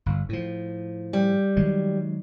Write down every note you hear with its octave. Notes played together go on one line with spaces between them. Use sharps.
G1
A2 F3
G3
D#3 F#3 G#3